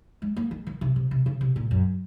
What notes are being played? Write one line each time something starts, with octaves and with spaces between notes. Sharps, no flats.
G#3
A#3
D#3
D#3
C3
C3
C3
C#3
C3
A#2
F#2